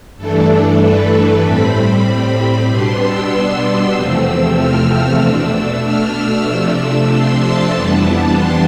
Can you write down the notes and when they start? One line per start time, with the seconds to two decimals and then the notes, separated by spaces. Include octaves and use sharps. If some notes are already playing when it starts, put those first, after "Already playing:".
0.17 G2 E3 A3 D4 A4
0.49 A4
0.80 B4
1.43 A2 G3 C4 B5
2.07 B5
2.69 B2 G3 B3 D4 C6
3.01 E6
3.95 E2 C3 F3 A3 C4
4.58 F6
5.21 B2 A3 D4 E6
5.53 E6
5.85 F6
6.16 E6
6.47 C3 F3 A3 D4 E6
7.10 C6
7.42 A5
7.73 F2 E3 G3 B3 D4 A5
8.37 C6